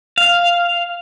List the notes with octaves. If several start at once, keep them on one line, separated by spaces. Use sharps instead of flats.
F5